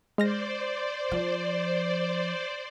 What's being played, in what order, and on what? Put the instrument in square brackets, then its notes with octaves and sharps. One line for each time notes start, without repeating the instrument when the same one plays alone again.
[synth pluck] G#3 F6 A#6 [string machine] C5 D5
[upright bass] F3